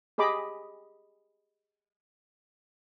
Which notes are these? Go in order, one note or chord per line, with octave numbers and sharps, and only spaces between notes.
G4 G#4 D#5 B5 D6